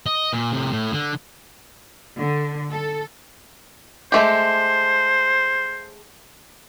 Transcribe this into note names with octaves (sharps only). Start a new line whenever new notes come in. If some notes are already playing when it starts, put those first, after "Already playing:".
D#5
A#2
A2 C3
A2
D3
D3
A4
G#3 A3 G4 C5